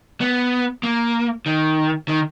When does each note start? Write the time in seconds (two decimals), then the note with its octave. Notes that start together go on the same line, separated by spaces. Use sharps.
0.21 B3
0.83 A#3
1.46 D#3
2.08 D#3